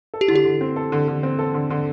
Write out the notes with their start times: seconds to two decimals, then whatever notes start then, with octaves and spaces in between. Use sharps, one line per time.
0.14 A4
0.21 G4
0.28 D3 E4
0.36 G4
0.45 D3
0.61 C4
0.76 A4
0.92 D3
1.08 D3
1.23 C4
1.39 A4
1.54 D3
1.70 D3